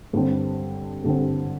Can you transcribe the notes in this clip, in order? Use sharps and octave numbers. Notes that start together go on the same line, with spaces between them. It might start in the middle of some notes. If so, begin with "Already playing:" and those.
G2 D3 G3 C4
G2 D3 G3 C4